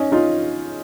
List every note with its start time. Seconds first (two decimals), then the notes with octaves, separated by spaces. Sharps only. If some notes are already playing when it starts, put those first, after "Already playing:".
Already playing: C#4 D#4
0.12 D#4 F4